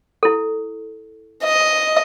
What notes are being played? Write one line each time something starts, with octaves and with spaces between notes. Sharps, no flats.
E4 A4
D#5